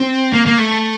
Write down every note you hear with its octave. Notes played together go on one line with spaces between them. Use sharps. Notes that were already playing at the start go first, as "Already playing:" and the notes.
Already playing: C4
A#3
A#3
A3